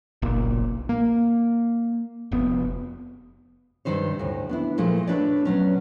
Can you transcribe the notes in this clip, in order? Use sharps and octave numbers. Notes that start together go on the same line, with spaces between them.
F#1 B1 A#2
A#3
F1 B3
G2 C3 D#3 C5 C#5
D2 A2
B3 D4 E4
A#2 F3 G#3 A3
A3 D4 B4 C#5 D5
B2 F#3 C#4